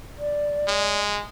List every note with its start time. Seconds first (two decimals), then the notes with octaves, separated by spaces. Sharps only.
0.19 D5
0.68 G#3